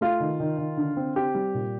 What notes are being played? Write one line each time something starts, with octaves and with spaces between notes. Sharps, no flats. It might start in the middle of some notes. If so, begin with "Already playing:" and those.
A3 F4
D#3
D#3
D#3
D3
C4
C4 G4
G3
A#2